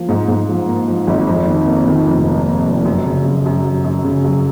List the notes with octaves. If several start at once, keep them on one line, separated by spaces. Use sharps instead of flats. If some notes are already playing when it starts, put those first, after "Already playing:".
Already playing: F3 A#3
G#2
G#2
F3
A#3
F3
G#1
F2
D#3
A#3
D#3
F1
A#3
A#3
F1
F#2
C#3
F#2
F#2
F#3
F#2
C#3
F#3